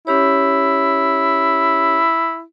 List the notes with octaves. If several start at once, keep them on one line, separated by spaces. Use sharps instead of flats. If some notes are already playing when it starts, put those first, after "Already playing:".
C#4 E4 G4 C#5